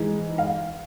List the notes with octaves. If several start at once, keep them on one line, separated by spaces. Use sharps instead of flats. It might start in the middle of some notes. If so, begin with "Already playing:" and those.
Already playing: G#2 E3 G#3
F5